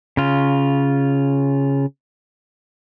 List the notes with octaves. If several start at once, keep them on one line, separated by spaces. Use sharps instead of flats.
C#3 F4